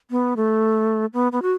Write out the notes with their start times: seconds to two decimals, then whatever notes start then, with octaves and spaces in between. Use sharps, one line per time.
0.11 B3
0.37 A3
1.13 B3
1.32 B3
1.42 F#4